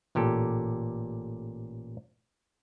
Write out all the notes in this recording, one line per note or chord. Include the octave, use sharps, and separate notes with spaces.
A1 A#2 G4 A4